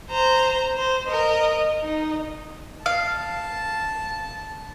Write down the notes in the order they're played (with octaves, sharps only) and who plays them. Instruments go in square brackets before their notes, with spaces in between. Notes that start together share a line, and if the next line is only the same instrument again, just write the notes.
[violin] C5 A#5
C5
A#4 D#5
D#4
[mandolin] F5 [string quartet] A5